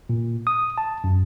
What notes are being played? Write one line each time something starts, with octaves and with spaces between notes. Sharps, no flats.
A#2
D#6
A5
F#2